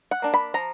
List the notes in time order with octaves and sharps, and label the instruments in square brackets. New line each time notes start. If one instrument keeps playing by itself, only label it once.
[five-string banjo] F#5
A#3 D4
B5
F3 A#5